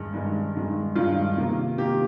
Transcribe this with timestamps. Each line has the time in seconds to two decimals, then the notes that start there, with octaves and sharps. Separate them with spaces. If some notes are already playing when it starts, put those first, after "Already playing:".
Already playing: G2 D#3 G#3
0.13 G2 D#3 G#3
0.55 G2 D#3 G#3
0.95 G2 D#3 G#3 F4
1.36 C3 D#3 A#3
1.78 C3 D#3 A#3 G4